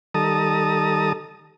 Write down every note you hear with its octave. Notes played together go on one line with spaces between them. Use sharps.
D#3 G3 A4 A5 A#5 D#6